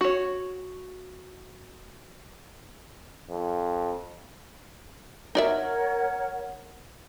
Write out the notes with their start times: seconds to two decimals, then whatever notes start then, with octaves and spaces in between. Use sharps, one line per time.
0.01 F#4 C#5
3.30 F2
5.35 D#4 A#4 C#5 D5 E5 F#5